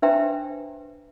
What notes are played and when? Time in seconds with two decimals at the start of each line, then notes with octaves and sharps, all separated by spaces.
0.02 D4 B4 C5 E5 G5 A#5